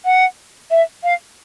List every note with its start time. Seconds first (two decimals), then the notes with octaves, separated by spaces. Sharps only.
0.05 F#5
0.71 E5
1.04 F5